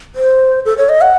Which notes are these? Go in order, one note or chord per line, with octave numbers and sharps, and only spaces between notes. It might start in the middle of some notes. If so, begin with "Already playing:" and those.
C5
A4
C#5
D#5
F#5